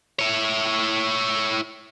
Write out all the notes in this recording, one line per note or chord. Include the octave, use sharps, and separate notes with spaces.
E4 C#5